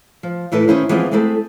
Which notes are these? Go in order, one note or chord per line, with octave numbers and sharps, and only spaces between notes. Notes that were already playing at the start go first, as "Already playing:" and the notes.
F3
A2 E3 E4 A4 B4
D#3 C#4 E4 C5
E3 F3 G#3 B3 C4 F4
G#3 A3 C4 E4 A4